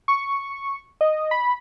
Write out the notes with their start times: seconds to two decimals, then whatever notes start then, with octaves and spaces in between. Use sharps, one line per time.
0.08 C#6
1.01 D#5
1.31 B5